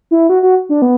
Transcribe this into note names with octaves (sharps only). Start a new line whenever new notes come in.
E4
F#4
F#4
D4
B3